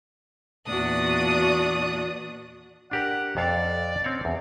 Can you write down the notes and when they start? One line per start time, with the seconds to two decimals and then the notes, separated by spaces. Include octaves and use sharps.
0.69 E2 A#2 D4 F#4 D#6 F#6
2.91 D4 G4 A#4 F#5
3.37 F2 A4 D5 F5
4.04 C4 C#4 C#5
4.25 E2